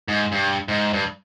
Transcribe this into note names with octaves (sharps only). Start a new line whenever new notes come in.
G#2
G2
G#2
G2